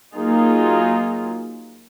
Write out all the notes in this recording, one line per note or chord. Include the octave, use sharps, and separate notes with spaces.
F#3 A#3 D#4 F4 G#4